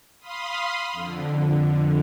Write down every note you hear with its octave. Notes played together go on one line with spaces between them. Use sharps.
F5 B5 C6 D#6
F2 D3